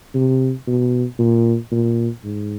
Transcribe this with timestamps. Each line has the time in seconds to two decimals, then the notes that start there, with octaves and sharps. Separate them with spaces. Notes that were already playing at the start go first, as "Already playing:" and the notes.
0.15 C3
0.67 B2
1.19 A#2
1.72 A#2
2.24 G#2